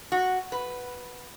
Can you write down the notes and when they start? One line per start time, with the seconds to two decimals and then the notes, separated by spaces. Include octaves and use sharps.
0.12 F#4
0.52 B4